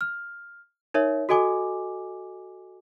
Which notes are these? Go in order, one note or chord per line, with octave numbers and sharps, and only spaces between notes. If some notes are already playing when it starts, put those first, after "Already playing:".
F6
D#4 A#4 C#5 E5
F#4 A4 D#5 G#5 D6